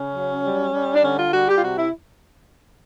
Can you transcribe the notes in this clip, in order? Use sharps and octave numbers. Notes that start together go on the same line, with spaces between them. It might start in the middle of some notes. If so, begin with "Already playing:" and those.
Already playing: C#3 C#4
F#3
G3
G3
D4
D3 C#4
F4
G3 F#4
G4
F4
C3 F#4
E4